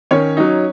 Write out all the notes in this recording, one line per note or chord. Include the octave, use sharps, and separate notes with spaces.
D#3 C#4 C#5
F#3 D#4